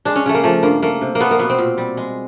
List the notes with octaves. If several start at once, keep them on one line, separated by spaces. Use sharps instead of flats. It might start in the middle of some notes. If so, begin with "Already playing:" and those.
G#3 D4
C#4
C#3 A3
A#3
F3 A3
G2 A#3
A3 A#3
C3
A#3
A3 B3
A#3
B2 B3
C4
A#2
G3
G#3